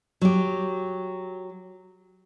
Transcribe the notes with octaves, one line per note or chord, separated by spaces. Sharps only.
F#3 G4